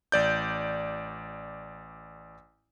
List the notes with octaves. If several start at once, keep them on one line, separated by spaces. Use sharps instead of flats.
A1 D5 G6